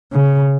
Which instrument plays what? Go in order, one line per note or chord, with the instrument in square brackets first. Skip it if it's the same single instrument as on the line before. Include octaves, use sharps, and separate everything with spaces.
[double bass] C#3